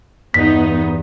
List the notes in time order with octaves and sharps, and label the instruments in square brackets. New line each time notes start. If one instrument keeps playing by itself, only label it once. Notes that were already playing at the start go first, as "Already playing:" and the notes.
[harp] E2 G2 [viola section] B3 D#4 [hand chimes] B6